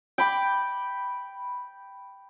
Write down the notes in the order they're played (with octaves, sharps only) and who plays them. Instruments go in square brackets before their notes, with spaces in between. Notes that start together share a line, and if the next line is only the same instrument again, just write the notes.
[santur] G5 B5 D6